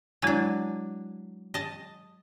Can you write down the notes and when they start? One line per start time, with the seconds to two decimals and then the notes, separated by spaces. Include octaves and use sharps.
0.22 F#3 G#3 D4 E4 G#5
1.54 D#5 A5